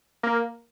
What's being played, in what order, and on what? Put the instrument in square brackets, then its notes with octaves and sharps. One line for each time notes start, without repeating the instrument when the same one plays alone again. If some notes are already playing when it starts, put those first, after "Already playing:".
[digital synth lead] A#3